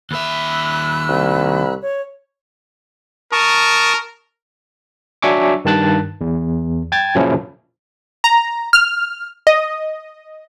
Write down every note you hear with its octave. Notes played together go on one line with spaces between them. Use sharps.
D#2 E5 B5 E6 F#6
C2
C#5
A#4 A5 C#6 D#6
F#3 D4 E5 G#5 C#6 D6
G2 D#3 A5 F#6 A6
E2
G5 G#6 A6
F#2 A#2 C#3 F3 C#4 E4
A#5
F6
D#5